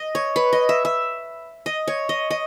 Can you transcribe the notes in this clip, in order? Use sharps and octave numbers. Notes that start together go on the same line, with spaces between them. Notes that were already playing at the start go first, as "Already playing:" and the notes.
Already playing: D#5
C#5
B4
D#5
E5
E5
D#5
C#5
D#5
D#5